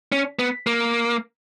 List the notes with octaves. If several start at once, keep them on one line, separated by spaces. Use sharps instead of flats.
C#4
B3
A#3